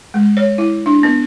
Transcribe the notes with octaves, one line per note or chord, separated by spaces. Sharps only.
G#3
C#5
E4
D4
B3